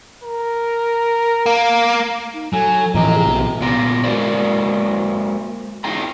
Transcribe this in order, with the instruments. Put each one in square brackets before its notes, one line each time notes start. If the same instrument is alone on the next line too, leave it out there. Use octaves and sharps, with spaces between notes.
[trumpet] A#4
[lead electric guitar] A#3
[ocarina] D#4
[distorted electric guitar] F#3 [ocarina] A4 [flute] G#5
[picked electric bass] A2 E3 F3 [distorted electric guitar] C3 G4 [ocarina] D#5 [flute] A#5
[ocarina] G#4
[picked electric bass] B1 [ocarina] F4
[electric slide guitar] A#2 B3 F4 G4 A#5
G#3 A#3 F#4 A#4 C5 D5
D#4 F4 G#4 G5 A#5